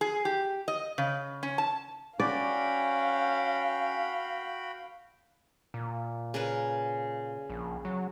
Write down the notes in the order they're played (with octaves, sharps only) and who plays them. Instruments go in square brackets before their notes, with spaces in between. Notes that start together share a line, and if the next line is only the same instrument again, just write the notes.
[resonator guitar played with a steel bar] G#4
G4
D#5
C#3
C#4
A5
[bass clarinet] C#4 [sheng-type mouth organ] F#4 G5 B5 [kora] D5 [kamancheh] F5
[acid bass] A#2
[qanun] C#3 A#4 B4
[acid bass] A#1
F#3